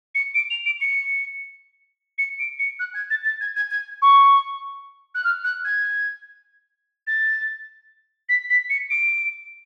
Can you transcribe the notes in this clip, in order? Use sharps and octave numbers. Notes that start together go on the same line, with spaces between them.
C#7
D7
F7
D7
C#7
C#7
D7
C#7
F#6
G#6
A6
A6
G#6
G#6
G#6
C#6
F#6
F6
F#6
G#6
A6
B6
B6
C#7
D7